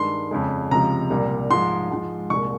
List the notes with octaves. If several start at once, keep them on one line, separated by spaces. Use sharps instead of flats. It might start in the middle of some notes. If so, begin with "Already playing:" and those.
Already playing: G2 D#3 G#3 C6
F2 C#3 G#3
C#2 C3 F3 G#3 A#5
C2 A#2 G3
G#2 F3 G#3 C6
G#2 F3 G#3
C2 A#2 G#3 C#6